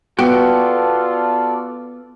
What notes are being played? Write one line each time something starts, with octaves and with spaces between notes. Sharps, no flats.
B3 F4 F#4 A4 D5 G5